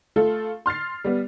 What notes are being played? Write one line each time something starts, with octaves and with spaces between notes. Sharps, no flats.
A3 F4 A4
C6 F6 A6 C7
G3 B3